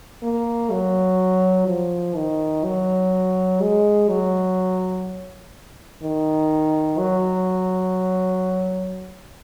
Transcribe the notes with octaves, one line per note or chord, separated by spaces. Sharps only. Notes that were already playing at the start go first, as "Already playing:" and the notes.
A#3
F#3
F3
D#3
F#3
G#3
F#3
D#3
F#3